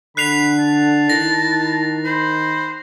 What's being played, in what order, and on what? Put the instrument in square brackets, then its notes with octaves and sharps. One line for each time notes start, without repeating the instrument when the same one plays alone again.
[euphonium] D3 [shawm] B5 [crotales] F#6 C7 F7
[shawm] A5
[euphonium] D#3 [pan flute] E4 [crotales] A#6
[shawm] C5 [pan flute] B5